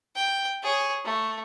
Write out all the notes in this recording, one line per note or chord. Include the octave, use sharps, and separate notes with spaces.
G5
G#4 C#5
A3